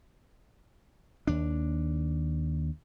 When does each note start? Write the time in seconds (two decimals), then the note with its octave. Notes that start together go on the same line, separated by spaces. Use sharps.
1.27 D#2 D4